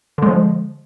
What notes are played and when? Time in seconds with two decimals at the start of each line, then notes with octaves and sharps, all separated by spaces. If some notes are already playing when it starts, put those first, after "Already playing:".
0.18 D3
0.23 G#3
0.27 F3